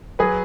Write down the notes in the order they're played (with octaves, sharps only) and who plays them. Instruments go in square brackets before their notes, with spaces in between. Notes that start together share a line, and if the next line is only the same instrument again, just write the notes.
[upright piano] F#3 G#4 B4